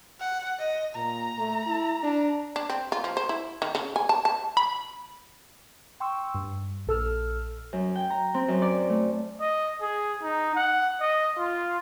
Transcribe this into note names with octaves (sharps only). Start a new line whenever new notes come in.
F#5
D#5
A#2 A#5
A3
E4
D4
D4
C4
F4
F3
C5
E4
D#3
C#3
G#5
A5
A5
B5
G5 C6 C#6 E6
G2
A#1 A4 E6 F6
F#2
G5
A#5
C4
F#2
D5
A3
D#5
G#4
D#4
F#5
D#5
F4